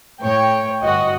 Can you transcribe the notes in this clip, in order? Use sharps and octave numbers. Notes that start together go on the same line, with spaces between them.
A2 C#5 G5
G1 F#4 D#5